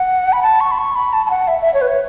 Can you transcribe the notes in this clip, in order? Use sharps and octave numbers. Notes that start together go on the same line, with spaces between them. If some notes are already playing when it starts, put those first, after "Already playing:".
Already playing: F#5
B5
A5
C#6
B5
C#6
B5
A5
A5
F#5
E5
E5
C#5
B4
C#5